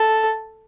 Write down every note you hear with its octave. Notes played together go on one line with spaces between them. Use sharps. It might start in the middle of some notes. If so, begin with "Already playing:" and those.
Already playing: A4